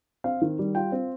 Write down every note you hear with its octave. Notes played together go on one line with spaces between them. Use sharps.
C4 F5
D#3
G3
F4 G5
C4